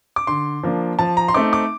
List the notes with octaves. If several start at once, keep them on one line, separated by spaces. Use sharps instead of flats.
D6
D3 C6
F3 A#3 D4
F3 A5
A#5
C6
A3 C4 D#4 D6
D6